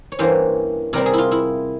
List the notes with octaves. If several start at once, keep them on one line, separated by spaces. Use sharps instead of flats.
C#5
G2 E3 A#3 C#4 C5
C3 G3 C4 A#4
G#4
E4 F4
E4